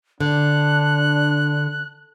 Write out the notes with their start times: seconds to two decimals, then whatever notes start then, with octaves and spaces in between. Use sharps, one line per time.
0.20 D3 D4 F#6